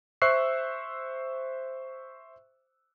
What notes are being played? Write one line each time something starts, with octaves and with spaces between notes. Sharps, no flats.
C5 E5 C#6 E6 F#6 C7